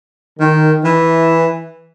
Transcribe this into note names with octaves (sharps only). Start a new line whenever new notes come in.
D#3
E3